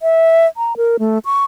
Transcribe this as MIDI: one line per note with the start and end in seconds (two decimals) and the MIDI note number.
0.02 0.47 76
0.57 0.76 82
0.77 0.97 70
0.99 1.19 57
1.25 1.44 85